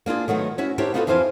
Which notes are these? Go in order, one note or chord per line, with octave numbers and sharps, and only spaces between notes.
A#3 D4 F4 G#4
D#3 F#3 A3 B3
C#4 E4 F#4
D4 E4 G4 A#4 C5 C#5
B3 D#4 F4 F#4 G#4 A4
F2 E3 E4 C5 F5 G#5